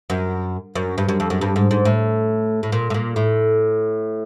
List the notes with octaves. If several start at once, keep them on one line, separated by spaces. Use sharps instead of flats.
F#2
F#2
G2
F#2
F2
F#2
G2
G#2
G#2
A2
A2
A#2
A2
A#2
A2